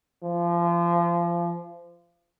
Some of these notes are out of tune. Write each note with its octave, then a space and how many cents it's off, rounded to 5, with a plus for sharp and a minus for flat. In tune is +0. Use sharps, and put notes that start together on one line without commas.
F3 -30